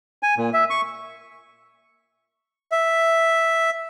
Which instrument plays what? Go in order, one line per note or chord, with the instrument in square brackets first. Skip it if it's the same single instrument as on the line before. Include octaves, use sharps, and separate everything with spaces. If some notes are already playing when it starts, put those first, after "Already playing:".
[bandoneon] G#5
A#2
E5
C#6
[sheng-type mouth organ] E5